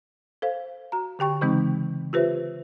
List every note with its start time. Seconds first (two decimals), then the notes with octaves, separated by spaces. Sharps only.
0.42 A4 C5 F5
0.92 F#4 A#5
1.19 D3 G4 G5 C#6
1.41 C#3 E3 G#3 C4 D#4
2.13 F4 G4 B4 C5 E5